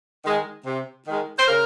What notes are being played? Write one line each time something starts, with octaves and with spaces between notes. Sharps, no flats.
D#3 G#3
C3
D#3 G#3
C5
C#3 A#4